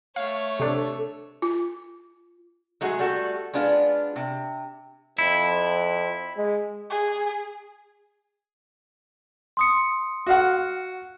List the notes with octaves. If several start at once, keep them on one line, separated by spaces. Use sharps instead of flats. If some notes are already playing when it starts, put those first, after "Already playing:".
A3 C#5 F5
C3 D4 A4
F4
F#3 G#3 A3 F#4 G#4
G3 A3 F#4 A4
G#3 B3 D4 F4
C3
F2 E4
G#3
G#4
C6 D#6 C#7
F#4 F5 F#5